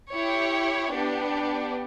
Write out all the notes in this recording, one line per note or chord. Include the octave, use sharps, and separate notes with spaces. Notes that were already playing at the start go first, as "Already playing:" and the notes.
E4 G4 C#5
B3 D4 G4